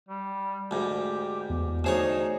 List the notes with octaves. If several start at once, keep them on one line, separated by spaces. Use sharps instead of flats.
G3
D2 G#2 G4
E2
D2 D#4 G#4 C5 C#5 C7 E7